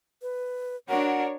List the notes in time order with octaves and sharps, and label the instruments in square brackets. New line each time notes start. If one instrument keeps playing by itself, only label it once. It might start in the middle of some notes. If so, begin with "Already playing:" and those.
[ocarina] B4
[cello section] D4 C#5 [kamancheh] F#4 A#4 [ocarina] F#5